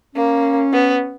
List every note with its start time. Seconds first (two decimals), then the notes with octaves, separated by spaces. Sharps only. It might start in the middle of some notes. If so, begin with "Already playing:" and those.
0.15 A#3 C#4
0.73 B3